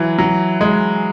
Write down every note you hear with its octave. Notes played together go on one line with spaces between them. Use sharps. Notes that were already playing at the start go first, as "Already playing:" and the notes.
Already playing: E3 F#3
F#3
G#3